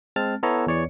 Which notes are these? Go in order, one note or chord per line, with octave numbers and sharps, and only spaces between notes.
G#3 C4 A5 F6 A6
B3 E4 A4 C#5 A#5
E2 E3 C#5 D5 C#7